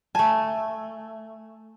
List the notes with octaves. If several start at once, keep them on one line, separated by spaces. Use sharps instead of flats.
A3 G#5 A5